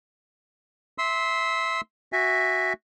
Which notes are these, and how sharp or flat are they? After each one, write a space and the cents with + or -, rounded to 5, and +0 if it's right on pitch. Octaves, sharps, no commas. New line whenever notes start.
E5 +0 C6 +0 E6 -25
F#4 +0 E5 +0 G#5 -20